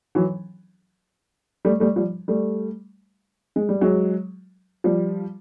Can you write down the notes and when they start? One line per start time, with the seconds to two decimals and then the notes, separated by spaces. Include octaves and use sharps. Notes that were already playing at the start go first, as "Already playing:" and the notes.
0.15 E3 F#3
1.65 G3 A3
1.80 G3 A3
1.96 F3 G3
2.28 G3 A3
3.56 G#3
3.69 G3
3.81 F#3 G#3
4.84 F3 G3